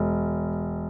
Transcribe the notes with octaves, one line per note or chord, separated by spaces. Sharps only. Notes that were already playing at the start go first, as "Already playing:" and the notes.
Already playing: E1